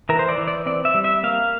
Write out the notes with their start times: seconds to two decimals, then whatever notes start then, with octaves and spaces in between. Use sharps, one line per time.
0.09 E3 A#4
0.19 C5
0.29 D5
0.38 E3
0.48 D5
0.66 C4 D5
0.85 E5
0.94 G3
1.04 E5
1.23 A#3 F5